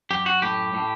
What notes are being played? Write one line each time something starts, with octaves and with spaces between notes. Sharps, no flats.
F#2 G4
F#4
A2 G4
A2